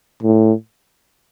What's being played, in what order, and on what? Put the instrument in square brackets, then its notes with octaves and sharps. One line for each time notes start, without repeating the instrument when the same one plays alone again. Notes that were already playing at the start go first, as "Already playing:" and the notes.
[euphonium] A2